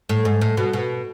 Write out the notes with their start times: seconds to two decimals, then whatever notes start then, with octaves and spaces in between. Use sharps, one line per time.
0.09 A2
0.25 G#2
0.41 A2
0.57 B2
0.73 B2